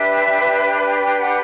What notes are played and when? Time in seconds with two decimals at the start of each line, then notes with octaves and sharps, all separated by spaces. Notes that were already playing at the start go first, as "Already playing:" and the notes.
Already playing: D4 G4 B4 E5
1.03 G5
1.19 F#5